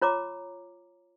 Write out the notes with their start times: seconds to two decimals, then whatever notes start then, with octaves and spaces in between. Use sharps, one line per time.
0.02 F4 C#5 A#5 D6